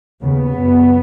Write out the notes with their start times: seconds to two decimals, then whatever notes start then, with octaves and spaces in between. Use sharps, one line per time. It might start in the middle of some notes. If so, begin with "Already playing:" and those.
0.22 D#2 C#3 B3
0.54 F#2 C#3